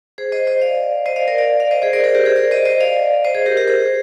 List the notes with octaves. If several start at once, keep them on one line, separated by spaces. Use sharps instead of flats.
G#4 C5
C5 D#5
C5 D#5
D5 F5
C5 D#5
D5 F5
A#4 D5
D5 F5
D5 F5
C5 D#5
G#4 C5
A#4 D5
G#4 C5
G4 A#4
G#4 C5
A#4 D5
C5 D#5
C5 D#5
D5 F5
C5 D#5
G#4 C5
G4 A#4
G4 A#4
G#4 C5